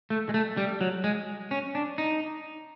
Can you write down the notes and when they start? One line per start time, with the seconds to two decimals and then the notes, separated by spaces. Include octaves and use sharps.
0.10 A3
0.29 G#3
0.34 A3
0.57 G3
0.81 F#3
1.04 G#3
1.51 C#4
1.75 D4
1.98 D#4